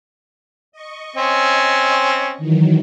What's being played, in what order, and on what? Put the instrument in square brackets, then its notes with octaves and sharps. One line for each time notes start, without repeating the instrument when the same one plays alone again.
[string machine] D#5 C#6
[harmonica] C4 C#4
[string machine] D#3 E3 F#3